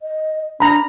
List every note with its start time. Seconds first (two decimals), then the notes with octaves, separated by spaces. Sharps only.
0.02 D#5
0.60 D4 A#5 B5